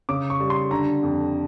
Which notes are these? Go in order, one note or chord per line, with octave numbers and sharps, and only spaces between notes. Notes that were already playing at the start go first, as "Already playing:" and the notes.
C#3 D6
C#6
G3
C6
D3 A#5
F2